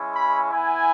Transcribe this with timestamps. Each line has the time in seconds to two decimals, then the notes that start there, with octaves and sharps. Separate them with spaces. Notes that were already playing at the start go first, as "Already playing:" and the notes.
Already playing: G#3 C#4 E4
0.15 B5
0.51 B3 E4 G#5